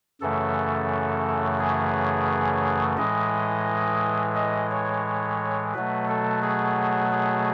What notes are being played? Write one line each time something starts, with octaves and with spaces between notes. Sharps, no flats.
F#2 C#3 E3 A3 A4
G#4
A2 E3 G#3 D#5
D#5
C#5
B2 F#3 A3 B4
A4
G#4
G#4